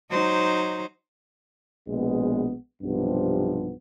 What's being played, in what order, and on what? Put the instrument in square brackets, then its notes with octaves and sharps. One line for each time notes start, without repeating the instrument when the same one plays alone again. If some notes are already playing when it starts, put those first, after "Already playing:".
[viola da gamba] F#3 D#4 C5
[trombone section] A#1 B2 G#3 B3
B1 G2 C3 F3 B3